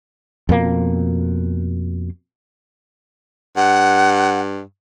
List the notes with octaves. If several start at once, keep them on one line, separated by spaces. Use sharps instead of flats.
F2 B2 A#3
G2 F#5